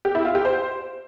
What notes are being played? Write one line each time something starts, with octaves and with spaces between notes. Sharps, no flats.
G4
E4
F4
G4
C5